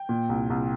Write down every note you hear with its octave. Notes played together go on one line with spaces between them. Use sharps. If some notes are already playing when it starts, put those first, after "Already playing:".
Already playing: G5
A#2
C2
C2